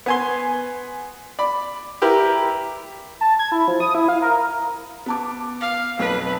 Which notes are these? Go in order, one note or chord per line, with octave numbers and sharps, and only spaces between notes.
B3 G#5 C6
D5 B5
E4 G4 A#4 B4
A5
G#6
E4
F3
D#6
E4
F5
A#4
B3 A5 D6
F5
B1 F2 B4